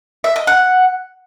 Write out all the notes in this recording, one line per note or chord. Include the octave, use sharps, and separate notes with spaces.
E5
D#5
F#5